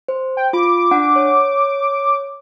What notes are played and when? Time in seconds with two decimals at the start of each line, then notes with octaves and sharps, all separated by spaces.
0.08 C5
0.37 G5
0.53 F4 B5 D6
0.91 D4 F#5
1.16 C#5